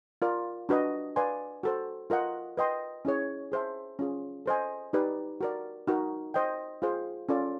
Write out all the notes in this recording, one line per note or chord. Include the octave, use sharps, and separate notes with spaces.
F4 A#4 D5
D4 F#4 B4 D#5
B4 D5 F5 G#5 C6
F#4 A4 C5
F4 A#4 D#5 F#5
B4 D#5 G5 C6
C#4 E4 G#4 C#5
G#4 C5 E5 A5
C#4 F4 G#4
A4 C5 D#5 G#5
D#4 G4 B4 D5
F#4 A#4 D5
D#4 F#4 A#4
C5 D#5 G5
F4 G#4 C5
C#4 F4 A4 D5